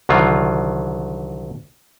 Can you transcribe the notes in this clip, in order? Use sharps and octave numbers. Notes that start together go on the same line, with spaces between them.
C2 D3 D#3 F#3 F4